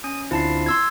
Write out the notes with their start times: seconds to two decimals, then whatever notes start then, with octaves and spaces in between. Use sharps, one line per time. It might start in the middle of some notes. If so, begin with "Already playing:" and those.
0.04 C#4 D#6
0.31 D2 C4 E4 F4 A5 C7
0.66 C6 E6 G#6